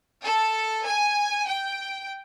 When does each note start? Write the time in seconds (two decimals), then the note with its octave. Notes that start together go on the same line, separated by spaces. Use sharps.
0.25 A4
0.86 G#5
1.47 G5